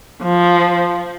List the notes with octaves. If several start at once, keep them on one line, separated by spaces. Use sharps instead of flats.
F3